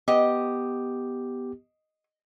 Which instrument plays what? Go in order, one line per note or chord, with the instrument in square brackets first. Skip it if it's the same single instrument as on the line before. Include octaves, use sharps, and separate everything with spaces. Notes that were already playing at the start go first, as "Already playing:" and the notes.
[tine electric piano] B3 G4 [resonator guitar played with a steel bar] D#5